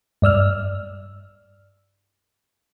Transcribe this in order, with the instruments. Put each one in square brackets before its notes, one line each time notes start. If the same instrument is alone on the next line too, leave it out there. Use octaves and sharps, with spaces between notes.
[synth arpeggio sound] G2 D5 E6 F6